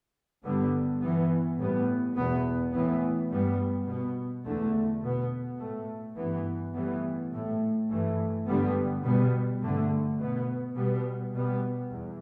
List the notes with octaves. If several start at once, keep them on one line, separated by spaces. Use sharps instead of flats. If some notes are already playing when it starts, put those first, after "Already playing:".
G2 D3 G3 B3
G2 E3 B3
A2 G3 B3
E2 B2 B3
A2 E3 B3
G2 G3 B3
B2 B3
E2 D3 A3
B2 B3
A2 A3
G2 E3 B3
A2 E3 G3 B3
A2 A3
G2 E3 A3
G2 D3 G3 B3
B2 G3 B3
G2 D3 A3
B2 B3
B2 G3 B3
B2 G3 B3
E2